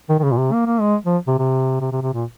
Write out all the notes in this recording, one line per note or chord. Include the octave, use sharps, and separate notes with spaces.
D#3
D#3
C#3
A#2
C3
A#3
A#3
G#3
F3
C3
C3
C3
C3
C3
A#2